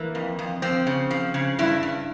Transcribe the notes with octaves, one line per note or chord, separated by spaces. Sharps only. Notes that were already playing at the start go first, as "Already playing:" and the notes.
Already playing: E3 A#3
F2
F2
F3 C4
C#3
F3
C#3
G2 E4
G2